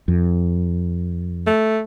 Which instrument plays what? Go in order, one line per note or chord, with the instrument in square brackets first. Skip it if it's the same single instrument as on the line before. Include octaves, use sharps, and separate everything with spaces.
[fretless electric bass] F2
[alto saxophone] A3